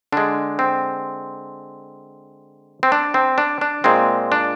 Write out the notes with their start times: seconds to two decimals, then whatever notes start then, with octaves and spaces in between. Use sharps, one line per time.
0.12 D3 G#3 D4
0.59 C4
2.83 C4
2.92 D4
3.14 C4
3.38 D4
3.61 D4
3.84 A#2 G#3 C4
4.32 D4